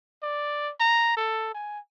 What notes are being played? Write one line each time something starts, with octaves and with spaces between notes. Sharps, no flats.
D5
A#5
A4
G#5